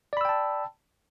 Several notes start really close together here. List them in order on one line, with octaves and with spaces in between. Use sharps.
D5 B5 E6 G5 A5